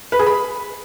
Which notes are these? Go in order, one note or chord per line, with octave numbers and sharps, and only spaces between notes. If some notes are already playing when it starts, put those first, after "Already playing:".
B4
G#4
B5